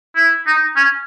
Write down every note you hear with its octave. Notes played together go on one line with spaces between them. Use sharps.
E4
D#4
C#4